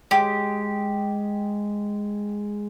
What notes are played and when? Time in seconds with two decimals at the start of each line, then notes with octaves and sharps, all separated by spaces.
0.11 G#3 G4